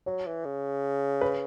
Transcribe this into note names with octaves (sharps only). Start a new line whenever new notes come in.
F#3 C#5
E3
C#3
B4